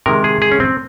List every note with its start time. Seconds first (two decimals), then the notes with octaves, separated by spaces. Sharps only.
0.06 C3 D#3 G#3 A#4
0.24 G#4
0.42 G#4
0.51 C#4
0.60 C4